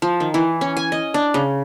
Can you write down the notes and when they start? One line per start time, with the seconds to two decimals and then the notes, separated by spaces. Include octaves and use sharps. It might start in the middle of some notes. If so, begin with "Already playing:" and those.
0.02 F3
0.20 D#3
0.34 E3
0.61 C#4
0.77 G#5
0.92 D#5
1.14 D4
1.34 C#3